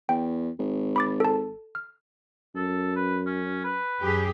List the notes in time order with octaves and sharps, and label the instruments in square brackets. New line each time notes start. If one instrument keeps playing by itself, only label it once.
[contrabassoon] E2 [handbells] G5
[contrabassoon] G#1
[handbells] B5 D6 A6
A4 A5
F6
[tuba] F#2 [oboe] A4
[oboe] B4
C#4
B4
[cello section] F#2 G4 G#4